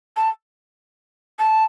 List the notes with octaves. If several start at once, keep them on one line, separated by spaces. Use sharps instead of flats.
A5
A5